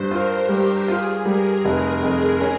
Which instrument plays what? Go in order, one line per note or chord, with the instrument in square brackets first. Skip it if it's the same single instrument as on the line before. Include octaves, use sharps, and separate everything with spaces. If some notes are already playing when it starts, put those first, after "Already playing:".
Already playing: [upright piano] G2 [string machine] C5
[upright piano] F4 [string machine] A#4
[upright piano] G3 [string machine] G4
[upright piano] F4 [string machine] G#4
[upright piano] G3 [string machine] A#4
[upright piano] F1 [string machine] A#4
[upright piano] F2
C#4